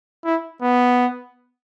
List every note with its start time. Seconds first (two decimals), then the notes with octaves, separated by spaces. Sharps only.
0.25 E4
0.62 B3